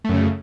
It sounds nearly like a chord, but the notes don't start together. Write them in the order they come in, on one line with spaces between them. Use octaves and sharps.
A3 F#2 C#3